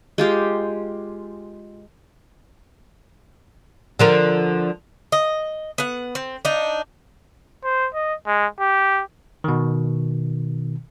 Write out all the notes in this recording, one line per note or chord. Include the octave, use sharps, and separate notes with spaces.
G#3 F4 G4 F5
D3 F3 A#4
D#5
B3 F#5
C4
D4 D#4
C5
D#5
G#3
G4
B2 D#3